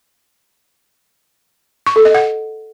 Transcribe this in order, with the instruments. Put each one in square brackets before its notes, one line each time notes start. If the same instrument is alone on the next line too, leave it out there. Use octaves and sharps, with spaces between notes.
[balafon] C#6
A4
D#5
F#5